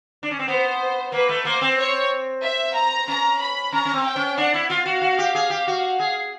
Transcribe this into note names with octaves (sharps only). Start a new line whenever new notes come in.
D4
C#4
C4
B3 C5
A#3 B4
A3
A#3 C5
C4
C#5
E5
A#5
C#4 A#5
B5
C#4 A#5
C#4
C4
G5
C#4
D4 F#5
E4
F4 F5
F#4
F#4
G4
G#4
G4
F#4
G#4